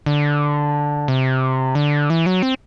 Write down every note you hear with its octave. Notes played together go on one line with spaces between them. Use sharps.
D3
C3
D3
E3
F#3
C4